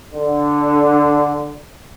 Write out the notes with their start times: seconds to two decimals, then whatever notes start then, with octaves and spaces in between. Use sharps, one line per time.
0.14 D3